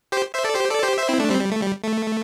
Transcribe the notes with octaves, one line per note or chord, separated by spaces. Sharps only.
G4 C5
C5 E5
A4 D5
G4 C5
A4 D5
G4 C5
C5 E5
C4 E4
A3 D4
G3 C4
G3
A3
G3
A3